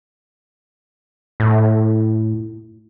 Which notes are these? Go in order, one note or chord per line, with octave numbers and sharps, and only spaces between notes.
A2